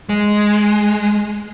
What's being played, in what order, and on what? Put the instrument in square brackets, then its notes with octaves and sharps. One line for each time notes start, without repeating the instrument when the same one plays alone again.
[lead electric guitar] G#3